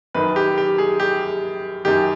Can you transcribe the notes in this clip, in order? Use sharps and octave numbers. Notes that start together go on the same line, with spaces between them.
F#2 D#3 B4
G4
G4
G#4
G4
F#2 D#3 G4